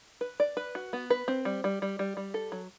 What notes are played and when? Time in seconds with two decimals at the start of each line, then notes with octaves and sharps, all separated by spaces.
0.21 B4
0.40 D5
0.57 B4
0.75 F#4
0.93 B3
1.10 B4
1.28 C4
1.45 G3
1.64 G3
1.82 G3
1.99 G3
2.17 G3
2.34 A4
2.52 F#3